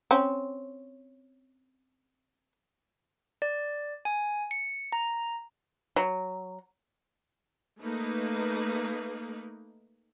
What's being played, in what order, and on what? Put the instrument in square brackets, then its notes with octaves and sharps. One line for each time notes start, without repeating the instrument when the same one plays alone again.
[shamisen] C4 C#4
[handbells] D5
G#5
C#7
A#5
[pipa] F#3
[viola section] A3 A#3 D#4 B4